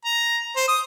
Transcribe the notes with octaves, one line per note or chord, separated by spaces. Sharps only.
A#5
C5
D#6